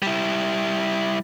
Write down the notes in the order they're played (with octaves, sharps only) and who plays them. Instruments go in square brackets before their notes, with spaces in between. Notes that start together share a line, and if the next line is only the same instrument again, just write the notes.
[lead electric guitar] G3 E4